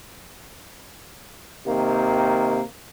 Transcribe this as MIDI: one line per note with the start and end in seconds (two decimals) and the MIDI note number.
1.67 2.62 48
1.67 2.62 51
1.67 2.62 58